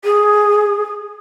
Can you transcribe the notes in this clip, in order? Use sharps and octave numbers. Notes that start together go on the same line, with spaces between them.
G#4